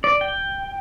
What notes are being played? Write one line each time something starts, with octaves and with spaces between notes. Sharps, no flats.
D5
G5